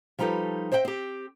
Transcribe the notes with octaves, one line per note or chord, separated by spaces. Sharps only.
F3 G3 D#4 G4 A4 B4
C5 D#5 E5 F#5 G5
C4 G4